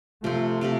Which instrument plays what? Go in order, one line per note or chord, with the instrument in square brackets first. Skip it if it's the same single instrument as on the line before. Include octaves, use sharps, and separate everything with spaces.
[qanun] C3 F3 C4 [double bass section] A3
[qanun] C3 F3 C4 G4